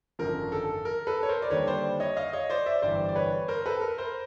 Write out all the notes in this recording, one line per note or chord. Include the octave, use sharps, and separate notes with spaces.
G#1 F#2 D3 F3 A#4
A4
A#4
A4 B4
C#5
A#4 C5
D5
D#2 D3 G3 B4 C#5
C5 D5
C#5 D#5
D#5 F5
C#5 D#5
C5 D5
D5 E5
G1 G2 E3 G3 C5 D5
D5
B4 C#5
A#4 C5
A4 B4
A#4
A#4 C5